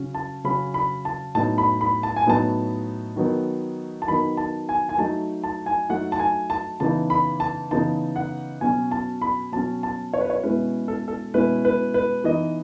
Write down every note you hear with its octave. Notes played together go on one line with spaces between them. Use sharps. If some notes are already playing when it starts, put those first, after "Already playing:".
Already playing: C#3 F#3 C#4
A5
C#3 F#3 C#4 B5
B5
A5
A2 F#3 B3 D#4 A5
B5
B5
A5
G#5
A2 F#3 B3 D#4 A5
D#3 F#3 B3 D#4
A5
D#3 F#3 B3 D#4 B5
A5
G#5
G#5
F#3 A3 D#4 A5
A5
G#5
F#3 A3 D#4 F#5
A5
G#5
A5
C#3 E3 B3 D#4 A5
B5
A5
C#3 E3 B3 D#4 A5
F#5
B2 F#3 C#4 G#5
A5
B5
B2 F#3 C#4 A5
A5
C#5
B4
C#5
B2 G#3 C#4 E4 B4
A4
A4
B2 G#3 C#4 E4 B4
B4
B4
E3 B3 D#4 D#5